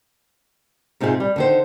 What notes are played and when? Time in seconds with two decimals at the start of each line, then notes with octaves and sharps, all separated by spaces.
1.00 G#2 C3 D#4 F4 G#4
1.20 G3
1.36 D3 D#3 C5